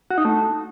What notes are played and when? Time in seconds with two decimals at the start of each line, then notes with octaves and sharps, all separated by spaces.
0.11 F#4
0.18 D#4
0.25 A3